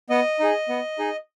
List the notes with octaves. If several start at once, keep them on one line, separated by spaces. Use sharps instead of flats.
B3 D#5
D#4 G#4
B3
D#4 G#4